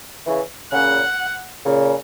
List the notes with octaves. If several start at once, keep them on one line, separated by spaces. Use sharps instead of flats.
C#3 E3
A#2 C#3 F#5
A#2 C#3